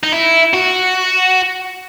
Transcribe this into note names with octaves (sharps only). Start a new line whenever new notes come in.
D#4
E4
F#4